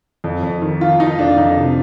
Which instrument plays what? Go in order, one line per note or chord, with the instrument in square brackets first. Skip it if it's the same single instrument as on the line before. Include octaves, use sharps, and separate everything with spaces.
[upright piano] F2
F2
D#3
D#3 F4
D#3 D#4
F2 D4
F2 D#4
C3